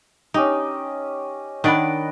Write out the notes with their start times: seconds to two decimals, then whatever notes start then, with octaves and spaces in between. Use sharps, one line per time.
0.34 C#4 D#4 G4 D#5
1.64 D#3 D4 D5 D#5 F#5 B5